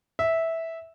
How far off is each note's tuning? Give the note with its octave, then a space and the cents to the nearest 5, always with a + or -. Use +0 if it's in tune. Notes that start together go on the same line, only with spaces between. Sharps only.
E5 -10